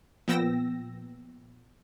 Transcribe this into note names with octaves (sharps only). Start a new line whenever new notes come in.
A#2 F3 B3 G5 E6 A#6